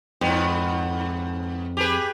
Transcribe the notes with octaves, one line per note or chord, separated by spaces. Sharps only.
F2 G#2 B3
G4 G#4 B4